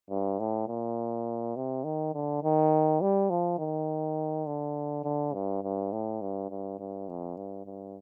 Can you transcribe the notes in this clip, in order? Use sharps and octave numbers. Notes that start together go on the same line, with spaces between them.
G2
A2
A#2
C3
D#3
D3
D#3
G3
F3
D#3
D3
D3
G2
G2
A2
G2
G2
G2
F2
G2
G2